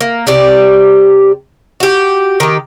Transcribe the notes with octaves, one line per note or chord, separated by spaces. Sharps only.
A#3
C3 G4 D5
F#4 G4
D#3 G4